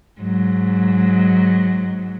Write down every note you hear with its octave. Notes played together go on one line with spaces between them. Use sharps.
G#2 F#3